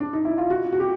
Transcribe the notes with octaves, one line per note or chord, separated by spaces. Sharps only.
D4
D#4
E4
F4
F#4
F#4
G4